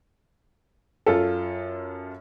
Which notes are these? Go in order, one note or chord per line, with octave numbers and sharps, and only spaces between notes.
F#2 F4 A4